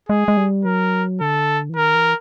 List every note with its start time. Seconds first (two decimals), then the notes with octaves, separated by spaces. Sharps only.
0.09 G#3 G#4
0.28 G#3
0.37 G3
0.65 F#3 A#4
1.21 D3 A4
1.70 E3
1.76 D#3 A#4
1.95 E3